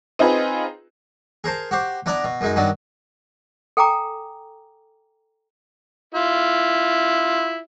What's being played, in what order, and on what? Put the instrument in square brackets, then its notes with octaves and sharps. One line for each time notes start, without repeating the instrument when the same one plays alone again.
[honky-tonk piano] C4 D#4 F4 G#4 B4
[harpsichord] G#4 A#4 C5 A5
F#4 G4 C5
B3 D4 E4 D5 A#5
B2
F#2 G#3 D#4
G2 D#3 F#3 B3 D4
[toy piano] A4 G5 G#5 A#5 D6
[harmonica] E4 F4